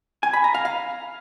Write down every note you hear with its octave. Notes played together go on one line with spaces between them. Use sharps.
G#5
B5
A#5
F5
F5